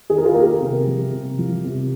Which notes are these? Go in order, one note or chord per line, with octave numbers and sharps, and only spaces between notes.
D#3 G#4
A#4
F4 G#4
A#3 G4 A#4
C3
F3
C3
F3
C3